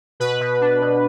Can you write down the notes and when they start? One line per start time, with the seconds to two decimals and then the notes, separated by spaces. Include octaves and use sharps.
0.20 B2 B4
0.41 B2
0.61 D4
0.81 B2